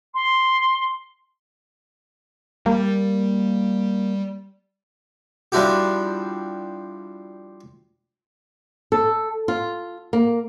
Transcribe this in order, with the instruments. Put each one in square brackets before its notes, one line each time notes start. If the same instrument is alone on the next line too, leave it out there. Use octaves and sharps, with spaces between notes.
[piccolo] C6
[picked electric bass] G3 [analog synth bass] A#3
[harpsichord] F3 G3 D4 E4 F#4 G4
[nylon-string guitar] A4
F4
A#3